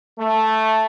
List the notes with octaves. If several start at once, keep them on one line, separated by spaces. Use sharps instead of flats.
A3